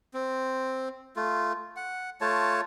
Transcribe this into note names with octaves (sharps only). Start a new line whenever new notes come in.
C4
A3 F4
F#5
A3 F4 C#5 A5